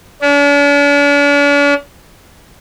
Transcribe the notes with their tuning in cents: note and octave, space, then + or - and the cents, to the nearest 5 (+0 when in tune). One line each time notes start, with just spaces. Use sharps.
D4 -45